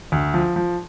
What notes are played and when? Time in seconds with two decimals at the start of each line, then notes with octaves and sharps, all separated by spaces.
0.12 D2
0.34 F3
0.56 F3